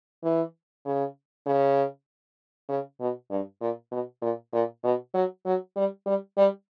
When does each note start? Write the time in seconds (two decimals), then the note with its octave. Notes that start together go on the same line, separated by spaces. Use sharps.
0.23 E3
0.86 C#3
1.46 C#3
2.69 C#3
3.00 B2
3.30 G2
3.61 A#2
3.91 B2
4.22 A#2
4.53 A#2
4.84 B2
5.14 F#3
5.46 F#3
5.76 G3
6.06 G3
6.37 G3